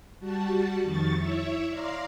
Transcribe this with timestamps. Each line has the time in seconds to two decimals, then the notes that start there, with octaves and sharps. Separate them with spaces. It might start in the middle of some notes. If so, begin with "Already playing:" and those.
0.19 G3 F#4 A5
0.83 F2 D#3 C#6 A6
1.17 E4 C#5 E5
1.69 D5 F5 A#5 C6